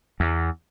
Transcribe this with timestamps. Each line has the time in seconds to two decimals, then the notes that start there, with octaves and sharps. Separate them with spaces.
0.20 E2